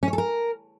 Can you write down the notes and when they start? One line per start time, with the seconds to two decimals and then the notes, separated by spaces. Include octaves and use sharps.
0.03 C#4
0.08 C#5
0.13 A4
0.18 A#4